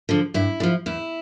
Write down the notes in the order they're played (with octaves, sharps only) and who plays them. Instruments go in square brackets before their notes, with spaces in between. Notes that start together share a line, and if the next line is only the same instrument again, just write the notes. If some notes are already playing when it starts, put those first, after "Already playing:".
[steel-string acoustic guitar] D3 F3
G2 E4
D3
F3
E2 E4